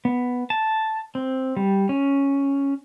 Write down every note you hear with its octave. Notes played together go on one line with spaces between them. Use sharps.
B3
A5
C4
G3
C#4